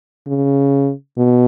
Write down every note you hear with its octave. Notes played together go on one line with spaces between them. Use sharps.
C#3
B2